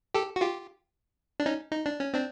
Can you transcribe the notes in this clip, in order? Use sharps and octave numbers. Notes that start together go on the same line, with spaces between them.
G4 A4
F#4
F4 G4
D4
C#4 D#4
D#4
D4
C#4
C4 D4